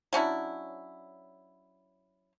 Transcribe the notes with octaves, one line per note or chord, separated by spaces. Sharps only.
F#3 C#4 D4 E4